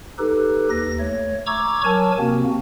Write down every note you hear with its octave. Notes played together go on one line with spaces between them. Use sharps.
D#4 G4 A4 B4
D#2 A#6
A3 C#5
A#5 C#6 D6 E6 G#6
F#3 A#4 C#5 G#5 A5
C3 A#3 C4 F#4